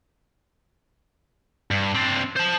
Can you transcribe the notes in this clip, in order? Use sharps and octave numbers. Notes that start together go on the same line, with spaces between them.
G2
C4 D4
C5 A5